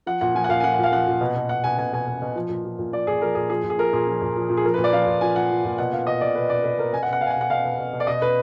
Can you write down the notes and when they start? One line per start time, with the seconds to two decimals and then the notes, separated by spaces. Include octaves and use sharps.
0.06 F3 F#5
0.21 A#2 F#5
0.35 F3 G#5
0.44 F#5
0.49 A#2 F5
0.60 G#5
0.64 F3 F#5
0.74 F#5
0.78 A#2
0.83 F5
0.92 F3 F#5
1.07 A#2
1.21 B2
1.36 B2
1.49 B2 F#5
1.64 B2 G#5
1.78 B2 G#5
1.93 B2 G#5
2.07 B2
2.22 B2
2.36 F3
2.49 A#2
2.65 F3
2.79 A#2
2.92 F3 D5
3.07 A#2 G#4
3.21 F3 A#4
3.35 A#2 G#4
3.50 F3 G#4
3.64 A#2
3.70 G#4
3.78 F3 A#4
3.93 A#2 G#4
4.07 F3
4.22 A#2
4.36 F3
4.50 A#2
4.57 G#4
4.65 F3 A#4
4.74 B4
4.78 A#2
4.84 D5
4.93 F3 F5
5.07 A#2
5.21 F3 G#5
5.35 A#2 F#5
5.51 F3
5.65 A#2
5.78 B2 F#5
5.93 B2 F5
6.07 B2 D#5
6.21 B2 D5
6.35 B2 B4
6.50 B2 D5
6.64 B2 B4
6.78 B2 A#4
6.92 B2 G#5
7.03 F#5
7.08 B2
7.13 F#5
7.21 B2 F5
7.27 G#5
7.31 F#5
7.36 B2
7.41 F#5
7.50 B2 F5
7.65 B2
7.79 B2
7.93 B2
8.00 D5
8.07 B2 D#5
8.22 B2 B4